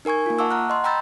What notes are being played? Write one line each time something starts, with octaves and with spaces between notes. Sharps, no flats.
D#4 A#4 G#5 C#6 G#6
A#3 F4
E5 F#5 A5 C#6 D6 E6
F#5 A#5 F6 F#6
D#5 C6
G5 A#5 B5 E6 G6 A6